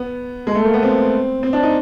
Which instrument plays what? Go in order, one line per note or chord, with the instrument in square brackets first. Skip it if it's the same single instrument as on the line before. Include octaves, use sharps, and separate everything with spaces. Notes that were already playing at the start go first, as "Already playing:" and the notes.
Already playing: [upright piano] B3
G#3
A3
A#3
B3
C4
C4
D4
D#4